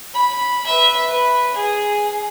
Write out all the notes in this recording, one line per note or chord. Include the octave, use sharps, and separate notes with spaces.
B5
B4 E5
B4
G#4